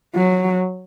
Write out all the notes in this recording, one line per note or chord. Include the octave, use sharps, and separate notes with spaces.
F#3